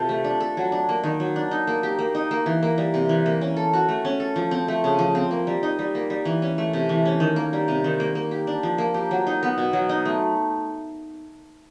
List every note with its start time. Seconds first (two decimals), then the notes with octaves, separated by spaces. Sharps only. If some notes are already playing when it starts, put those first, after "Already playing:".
Already playing: C3 F4 A4
0.09 A3
0.24 D4
0.40 A4
0.57 F#3
0.72 D4
0.89 A#3
1.04 D#3
1.20 F#3
1.36 D4
1.51 D#4
1.67 A#3
1.83 G4
1.99 A#3
2.15 D#4
2.31 A#3
2.46 E3
2.63 A#3
2.78 G3
2.94 C3
3.09 E3
3.26 A#3
3.41 C#4
3.57 A4
3.73 F#4
3.89 A3
4.05 C#4
4.20 A4
4.36 F3
4.51 C4
4.68 A3
4.84 C#3
4.99 F3
5.15 C4
5.31 A#3
5.47 G3
5.63 D#4
5.79 G3
5.95 A#3
6.10 G3
6.25 E3
6.42 C#4
6.58 A3
6.73 C3
6.89 E3
7.06 C#4
7.20 D#3
7.36 A#3
7.53 G3
7.68 C3
7.84 D#3
8.00 A#3
8.15 A#3
8.31 G4
8.47 D4
8.63 F3
8.78 A#3
8.94 G4
9.11 F#3
9.27 D#4
9.43 B3
9.58 B2
9.73 F#3
9.89 D#4
10.06 A3